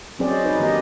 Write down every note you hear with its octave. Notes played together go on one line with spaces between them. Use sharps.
F#3 C4 C#4 G#4 C5 D5
D#5
D#4 B4
D#3 A#3 D4 G4 D#5